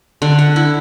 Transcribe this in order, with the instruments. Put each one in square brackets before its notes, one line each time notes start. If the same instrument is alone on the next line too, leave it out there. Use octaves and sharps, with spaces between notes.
[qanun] D3
F#5
E4